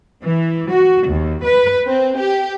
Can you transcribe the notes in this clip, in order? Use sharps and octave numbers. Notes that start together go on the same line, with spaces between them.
E3
F#4
D#2
B4
C4
G4